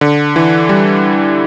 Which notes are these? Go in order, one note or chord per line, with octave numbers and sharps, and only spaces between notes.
D3
E3
G3